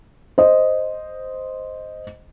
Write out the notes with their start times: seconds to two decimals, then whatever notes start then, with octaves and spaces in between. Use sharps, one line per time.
0.38 C5 D#5